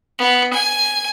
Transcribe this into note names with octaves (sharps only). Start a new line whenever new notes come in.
B3
G#5